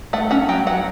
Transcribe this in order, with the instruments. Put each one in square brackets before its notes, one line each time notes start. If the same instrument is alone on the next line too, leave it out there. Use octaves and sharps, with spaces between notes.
[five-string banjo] A3 F#5
C#4 F#5
F#3 G5
F#3 F#5